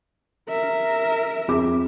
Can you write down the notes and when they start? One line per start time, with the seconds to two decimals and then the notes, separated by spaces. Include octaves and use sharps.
0.49 A#4 E5
1.48 F2 G#4 D6